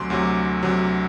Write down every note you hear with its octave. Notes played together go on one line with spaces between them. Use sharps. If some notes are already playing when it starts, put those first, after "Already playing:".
Already playing: D2 C3 F#3 C6 D6
D2 C3 F#3
D2 C3 F#3